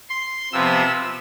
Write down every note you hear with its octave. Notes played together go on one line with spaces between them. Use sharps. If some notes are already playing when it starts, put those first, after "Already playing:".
C6
C3 F3 B3 E6